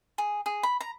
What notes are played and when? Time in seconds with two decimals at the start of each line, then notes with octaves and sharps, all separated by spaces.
0.18 G#4
0.46 G#4
0.63 B5
0.81 A#5